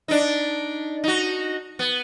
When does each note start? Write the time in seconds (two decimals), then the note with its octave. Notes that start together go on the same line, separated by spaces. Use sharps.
0.08 D4 D#4
1.04 D#4 F#4
1.79 B3